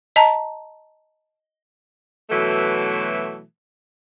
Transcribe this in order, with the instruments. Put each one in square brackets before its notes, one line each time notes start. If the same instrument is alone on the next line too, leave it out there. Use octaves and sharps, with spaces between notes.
[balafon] D#5 A5 A#5
[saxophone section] B2 E3 F#3 A3